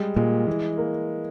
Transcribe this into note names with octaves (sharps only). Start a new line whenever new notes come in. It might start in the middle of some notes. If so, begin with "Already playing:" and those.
Already playing: G3 G#3
A#2 G#3
E3
A#3